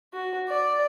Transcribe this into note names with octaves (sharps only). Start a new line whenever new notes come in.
F#4
D5